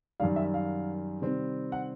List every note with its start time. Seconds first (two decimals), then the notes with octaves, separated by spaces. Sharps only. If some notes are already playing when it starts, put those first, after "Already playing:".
0.20 F#2 D#3 G3 F5
0.36 E5
0.54 F5
1.21 C3 D#3 G3 C4
1.72 F#5